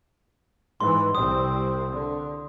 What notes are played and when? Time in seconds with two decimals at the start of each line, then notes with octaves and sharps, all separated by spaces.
0.81 G#2 E3 C6
1.15 C2 C3 C4 D#6
1.91 D3